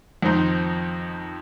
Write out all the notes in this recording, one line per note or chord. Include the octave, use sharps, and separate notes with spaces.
F2 D#3 C4 D#4